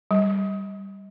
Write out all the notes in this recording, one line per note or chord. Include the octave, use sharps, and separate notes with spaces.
G3